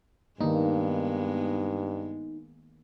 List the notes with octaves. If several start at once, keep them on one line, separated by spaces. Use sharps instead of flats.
G2 D#3 G#3 A#3 B3 D#4